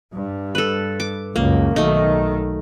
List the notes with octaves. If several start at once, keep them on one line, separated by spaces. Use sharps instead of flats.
G2
A4 B4
D6
C#2 F#2 A#3
B1 D#3 A3 D#4